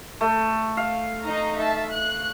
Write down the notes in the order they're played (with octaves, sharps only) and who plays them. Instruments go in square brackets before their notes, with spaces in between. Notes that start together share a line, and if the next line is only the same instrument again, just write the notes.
[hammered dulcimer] A3
F5
[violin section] D#4 D#5 A#5
E5 A5
F#6